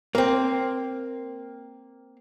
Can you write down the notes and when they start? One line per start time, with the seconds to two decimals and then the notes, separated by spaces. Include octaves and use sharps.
0.15 A#3 C4